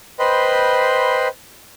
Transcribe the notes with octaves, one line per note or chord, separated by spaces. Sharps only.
B4 C5 D#5 G5 B5 C6